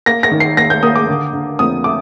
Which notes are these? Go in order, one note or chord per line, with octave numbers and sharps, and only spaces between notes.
A#3 A#6
A#6
D#3
C7
D#2 A#6
G6
A#3 D#6
D6
D3
D3
F2 D#6
A3 D6